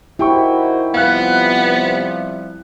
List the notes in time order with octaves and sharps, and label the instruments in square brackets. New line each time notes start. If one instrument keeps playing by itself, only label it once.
[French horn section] D#3 F#4 C5 [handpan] E4 [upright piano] G4 G5 C#6
[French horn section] C3 F3 G3 [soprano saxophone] B3 [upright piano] F5 F#6